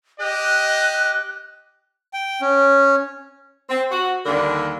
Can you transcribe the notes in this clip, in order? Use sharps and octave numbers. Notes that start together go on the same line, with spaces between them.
G4 D#5 F#6
G5
C#4
C4
F#4
D#2 D3 G3 D4 A#4